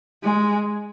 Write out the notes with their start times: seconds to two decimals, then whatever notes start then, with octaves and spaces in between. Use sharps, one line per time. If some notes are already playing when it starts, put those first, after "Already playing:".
0.23 G#3